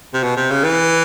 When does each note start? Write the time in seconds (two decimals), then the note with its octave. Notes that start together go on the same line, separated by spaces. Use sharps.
0.14 C3
0.23 B2
0.37 C3
0.50 C#3
0.64 E3